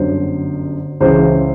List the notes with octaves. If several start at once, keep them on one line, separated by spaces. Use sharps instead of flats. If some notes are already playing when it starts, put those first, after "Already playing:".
Already playing: G1 F#2 D3 C5
C#2 C#3 E3 C5